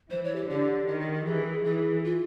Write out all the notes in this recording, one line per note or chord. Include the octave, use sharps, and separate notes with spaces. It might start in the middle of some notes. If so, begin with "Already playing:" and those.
E3 C5
C#5
G4
D3 G4
D#3 G4
G4
G4
E3 G#4
E3 G#4
F4